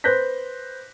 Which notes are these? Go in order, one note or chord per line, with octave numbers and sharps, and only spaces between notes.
B4 C5 F#6 G6 A#6 B6